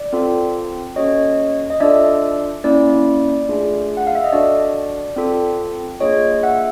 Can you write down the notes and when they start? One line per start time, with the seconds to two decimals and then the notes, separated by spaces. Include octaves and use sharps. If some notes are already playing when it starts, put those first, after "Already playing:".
Already playing: D5
0.13 C4 F4 A4
0.96 A#3 C#4 F#4 A4 C#5 D#5
1.70 D#5
1.80 D4 F4 A4 D5 E5
2.64 A#3 C#4 E4 D5
3.49 A3 D4 F4 G#4
3.97 F#5
4.07 F5
4.15 E5
4.24 D#5
4.32 D4 F#4 A4 D5
5.16 C4 F4 A4
6.00 A#3 D4 F4 G#4 C#5 D#5
6.43 E5 F#5